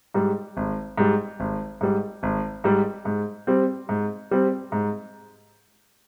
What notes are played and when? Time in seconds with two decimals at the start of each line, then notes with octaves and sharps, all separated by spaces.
0.14 G#2 G3
0.57 G#1
0.98 G#2 G3
1.40 G#1
1.81 G#2 G3
2.23 G#1
2.64 G#2 G3
3.05 G#2
3.47 G3 C4
3.89 G#2
4.31 G3 C4
4.72 G#2